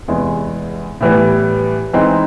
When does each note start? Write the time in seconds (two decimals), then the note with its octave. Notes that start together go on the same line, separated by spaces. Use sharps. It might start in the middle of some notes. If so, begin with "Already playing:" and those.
0.08 E2 C3 E3 G#3
1.01 A2 E3 G3 B3
1.93 E3 G#3 C4 D#4